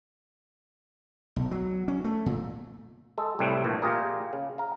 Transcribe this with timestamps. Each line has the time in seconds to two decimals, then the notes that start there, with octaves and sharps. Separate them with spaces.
1.36 B1
1.51 F#3
1.88 C#4
2.04 A3
2.26 A#2
3.18 G#3 A4
3.39 C2 A2 G3 A3 C4 B4
3.64 A#1 A#2 E3 A3
3.82 A#2 F4 G4 G#4 A#4
4.33 C#3
4.58 F5 A#5